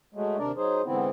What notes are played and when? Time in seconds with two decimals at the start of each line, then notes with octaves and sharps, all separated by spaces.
0.15 F#3 G#3 A3
0.39 D#2 C3 D4 A#4 D5
0.56 F#3 D#4 G#4 C5
0.85 G#2 D3 E3 B3 C4 E4